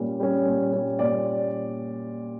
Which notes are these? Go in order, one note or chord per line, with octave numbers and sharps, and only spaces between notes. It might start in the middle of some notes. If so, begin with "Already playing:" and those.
Already playing: A#2 G3 C#4
G3 C#4
A#2
G3 C#4
A#2 D5